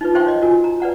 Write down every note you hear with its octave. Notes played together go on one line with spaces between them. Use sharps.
D#4 F4 B4
D#4 C5 F5 G5 C6 C#6
C#5 D#5
F4 F#4 A#4 G#5
A#5
B4 D5 F#5 A#5